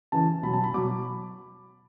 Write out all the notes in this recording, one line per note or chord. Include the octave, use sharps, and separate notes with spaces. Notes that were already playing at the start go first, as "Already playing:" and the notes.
C#3 E3 A5
B2 F#3 B5
A5
B5
B2 F#3 D6